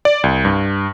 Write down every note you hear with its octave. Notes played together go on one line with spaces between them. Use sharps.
D5
C2
G2